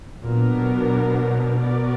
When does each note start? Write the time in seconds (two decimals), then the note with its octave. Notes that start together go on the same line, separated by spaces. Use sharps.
0.22 A#2 F#3 B3 D4 A#4
0.57 B2
1.62 B3 F#4 A#4 D5